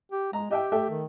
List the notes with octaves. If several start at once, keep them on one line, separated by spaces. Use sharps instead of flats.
G4
G#3 A#5
G4 D#5 E5 G5
A3 E5 G5
D#3